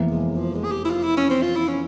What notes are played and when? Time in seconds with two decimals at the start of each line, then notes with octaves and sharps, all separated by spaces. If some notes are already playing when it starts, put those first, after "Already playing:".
Already playing: F1 E2 E3 A#3
0.10 G#3
0.37 F3
0.55 G#3
0.64 G#4
0.72 G4
0.85 E4
0.90 F4
1.03 E4
1.17 C#4
1.30 C4
1.43 F4
1.56 E4
1.68 C#4